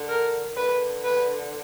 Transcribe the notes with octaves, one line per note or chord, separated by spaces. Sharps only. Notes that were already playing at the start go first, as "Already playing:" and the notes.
Already playing: D3
A#4
D3 B4
B4